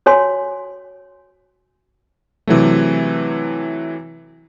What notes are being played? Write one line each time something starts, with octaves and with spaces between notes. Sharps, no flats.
F#4 C#5 G#5 C6
C3 E3 F#3 A3